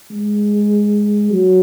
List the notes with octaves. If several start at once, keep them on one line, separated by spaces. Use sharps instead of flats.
G#3
F#3